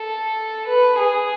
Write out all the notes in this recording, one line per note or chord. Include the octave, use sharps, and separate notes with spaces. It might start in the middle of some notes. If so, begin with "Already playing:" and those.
Already playing: A4
B4
G#4